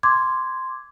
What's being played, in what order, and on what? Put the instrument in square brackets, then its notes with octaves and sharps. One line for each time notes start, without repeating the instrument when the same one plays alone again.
[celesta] C6 D6 G#6